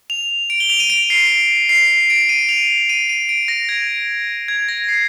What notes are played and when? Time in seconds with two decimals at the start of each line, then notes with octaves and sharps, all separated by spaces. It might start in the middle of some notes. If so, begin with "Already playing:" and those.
0.10 F7
0.50 D7
0.60 G7
0.70 F7
0.80 D#7
0.90 D7
1.10 C7
1.69 C7
2.10 D7
2.29 D#7
2.49 F7
2.89 D#7
3.09 D#7
3.29 D7
3.48 A#6
3.69 G#6
4.48 G#6
4.69 A#6
4.89 C7